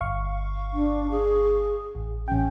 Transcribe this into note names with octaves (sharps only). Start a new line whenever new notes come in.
G1 F5 C#6
D4
G#4
A1
A1 C#4 G5